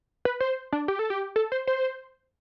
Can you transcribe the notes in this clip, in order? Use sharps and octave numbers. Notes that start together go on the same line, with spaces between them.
B4
C5
D4
G4
A4
G4
A4
C5
C5